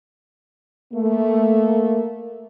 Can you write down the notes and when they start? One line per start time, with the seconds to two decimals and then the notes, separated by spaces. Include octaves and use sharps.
0.93 A3 A#3